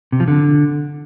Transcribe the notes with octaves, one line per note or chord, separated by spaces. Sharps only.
C3
F3
D3